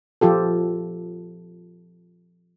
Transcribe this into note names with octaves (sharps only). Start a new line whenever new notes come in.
F3 F4 G4 A4